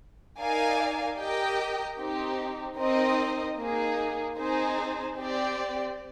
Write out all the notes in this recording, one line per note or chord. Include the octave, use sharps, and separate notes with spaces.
D#4 A#4 D5 F5 G#5
G4 A#4 D#5 G5
C4 D#4 G4
C4 D#4 A#4 D#5
A#3 D#4 G#4
C4 D#4 G#4 C5
C4 G4 D5